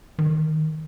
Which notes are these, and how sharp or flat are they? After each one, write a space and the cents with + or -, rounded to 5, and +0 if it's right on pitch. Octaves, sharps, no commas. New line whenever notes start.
D#3 +5